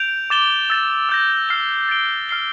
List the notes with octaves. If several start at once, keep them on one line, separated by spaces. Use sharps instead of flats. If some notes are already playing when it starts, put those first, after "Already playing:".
Already playing: G6 D7 F7
D6 A6 E7 G7
E6 A6 E7
E6 G6 A#6
F6 C7 G7
A6 D7 G7
F6 C7 G7